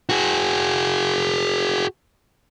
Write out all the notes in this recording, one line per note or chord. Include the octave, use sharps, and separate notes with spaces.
F#4 G#4